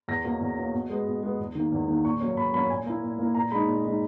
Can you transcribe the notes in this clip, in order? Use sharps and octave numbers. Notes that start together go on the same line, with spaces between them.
E2 A#6
B2 A#3 C#4
E2
B2 A#3 C#4
B2
G#3 B3
B2
G#3 B3
E2
D#3 A#3
E2
D#3 A#3
A#2 C#6
F#3 A#3 C#4
A#2 B5
F#3 A#3 C#4 B5
A#2 G#5
A#3 E4
A#2
A#3 E4
A#2 A#5
G#3 D#4 B5
A#2
G#3 D#4